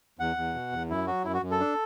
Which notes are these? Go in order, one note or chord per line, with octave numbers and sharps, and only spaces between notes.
E2 F#5
E2
B2
E2
F#2 E4
F#3 F#4
F#2 E4
F#4
F#2
A4
D4